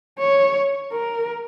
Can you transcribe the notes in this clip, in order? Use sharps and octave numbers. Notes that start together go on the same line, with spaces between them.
C#5
A#4